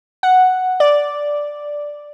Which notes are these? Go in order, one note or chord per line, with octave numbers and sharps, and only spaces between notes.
F#5
D5